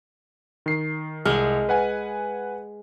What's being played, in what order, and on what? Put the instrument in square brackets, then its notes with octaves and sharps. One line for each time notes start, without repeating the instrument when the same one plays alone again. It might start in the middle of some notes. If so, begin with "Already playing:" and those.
[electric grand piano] D#3 C7
[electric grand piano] C2 F6 [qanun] G#3
[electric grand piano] B4 F#5 G#5